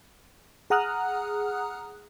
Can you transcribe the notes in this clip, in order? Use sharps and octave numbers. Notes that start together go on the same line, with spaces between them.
G#4 F#5 A#5 D#6 F6 F#6